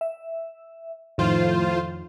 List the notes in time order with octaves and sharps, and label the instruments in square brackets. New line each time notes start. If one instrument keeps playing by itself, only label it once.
[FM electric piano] E5
[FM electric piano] F2 D#3 F3 [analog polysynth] A2 F4 C5